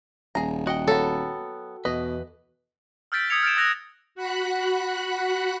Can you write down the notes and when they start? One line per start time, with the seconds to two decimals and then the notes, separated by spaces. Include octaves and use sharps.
0.35 D#1 G#4 A#5
0.67 F#4 D#5 F#5 G5
0.87 F#3 B3 A4
1.85 E2 B2 B4 D#5
3.12 E6 F6 G6 A6 B6 D7
3.30 D#6 E6 G#6 C#7 F7
3.43 F6 A6 D7 E7
3.57 E6 F#6 A#6 F7
4.15 F#4 F#5 B5 F#6